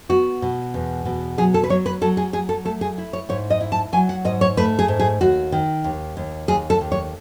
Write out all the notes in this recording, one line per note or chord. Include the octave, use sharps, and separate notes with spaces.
B3 F#4
B2
E2
B2
F#3 G#4
A4
B4
F#3 C#5
B4
F#3 A4
G#4
F#3 G#4
A4
A3 A4
G#4
E4
C#5
G#2 C#5
D#5
E4
A5
F#3 G#5
F#5
G#2 D#5
C#5
A3 B4
G#4
G#2
G#4
D#2 F#4
D#3
D#2
D#2
D#2 G#4
A4
D#2
C#5